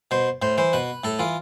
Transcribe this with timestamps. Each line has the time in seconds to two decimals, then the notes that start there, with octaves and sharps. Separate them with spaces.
0.11 B2 C5
0.42 A2 C5
0.58 E3 C5
0.73 B2 B4
1.04 A2 A4
1.19 E3 F4